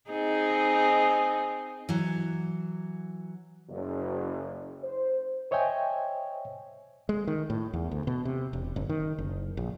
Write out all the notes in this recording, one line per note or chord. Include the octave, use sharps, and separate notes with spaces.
C4 D#4 G#4
E3 F#3
F#1
C5
C5 C#5 D#5 E5 G5 G#5
G#3
D#3
A2
E2
D2
B2
C3
E1
F#1
D#3
F#1
A#1